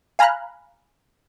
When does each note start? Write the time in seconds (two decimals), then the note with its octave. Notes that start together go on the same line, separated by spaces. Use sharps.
0.19 F5 G#5 A#5 B5 F6 F#6